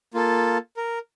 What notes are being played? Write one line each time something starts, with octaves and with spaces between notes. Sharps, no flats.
A#3 F4 A4
A#4